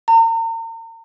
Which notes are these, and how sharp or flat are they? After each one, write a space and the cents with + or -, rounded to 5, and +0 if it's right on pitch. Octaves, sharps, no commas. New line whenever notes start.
A#5 -40